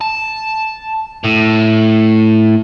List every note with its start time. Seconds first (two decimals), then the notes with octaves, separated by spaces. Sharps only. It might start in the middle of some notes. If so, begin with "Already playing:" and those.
0.01 A5
1.24 A2